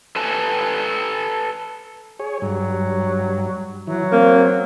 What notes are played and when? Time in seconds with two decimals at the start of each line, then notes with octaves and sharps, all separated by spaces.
0.16 A4 B4 G#5 A5
2.19 G#4 C#5
2.42 G2 F#3
3.87 E3 F#3
4.12 A#3 C4